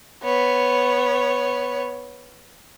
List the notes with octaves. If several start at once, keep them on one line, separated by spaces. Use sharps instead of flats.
B3 C#5